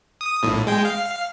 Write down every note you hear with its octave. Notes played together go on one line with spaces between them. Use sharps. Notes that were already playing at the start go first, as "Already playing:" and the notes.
D#6
A#1 A2
G#3 G5
F5